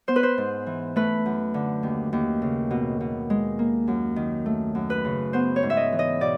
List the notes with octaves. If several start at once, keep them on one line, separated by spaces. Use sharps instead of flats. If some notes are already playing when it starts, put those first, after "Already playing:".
B3 C5
B4
C5
G#2
E3
A3 B4
F#2
D3
D#2
D#2
C#3
B2
B2
G#3
A#3
F#2
D#3
A3
F#2
B4
C#3
B3 C5
C#5
G#2
E5
D#5
E3
D#5
B2 D5